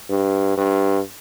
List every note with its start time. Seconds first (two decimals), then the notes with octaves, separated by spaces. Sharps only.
0.10 G2
0.57 G2